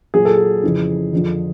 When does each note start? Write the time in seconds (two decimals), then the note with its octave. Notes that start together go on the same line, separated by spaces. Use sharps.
0.14 A#2 F#3 G#4
0.25 A4
0.36 G#4
0.63 F2 C#3 E3
1.13 F2 D3 F3